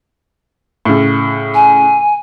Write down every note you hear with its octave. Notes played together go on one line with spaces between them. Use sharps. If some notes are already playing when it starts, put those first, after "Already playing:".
A2 C#3
G#5